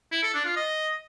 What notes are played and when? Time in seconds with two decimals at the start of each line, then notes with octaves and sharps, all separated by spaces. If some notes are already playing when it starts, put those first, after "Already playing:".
0.12 E4
0.23 A4
0.34 D4
0.45 F4
0.56 D#5